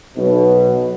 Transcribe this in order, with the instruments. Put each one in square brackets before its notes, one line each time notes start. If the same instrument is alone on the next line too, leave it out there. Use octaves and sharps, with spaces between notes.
[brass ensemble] B1 B2